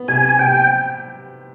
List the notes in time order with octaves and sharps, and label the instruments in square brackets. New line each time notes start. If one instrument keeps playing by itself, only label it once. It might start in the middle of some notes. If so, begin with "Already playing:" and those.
Already playing: [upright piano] B3
[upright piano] C3 [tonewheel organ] G#5
[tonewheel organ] G#5
[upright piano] C3 [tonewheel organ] G5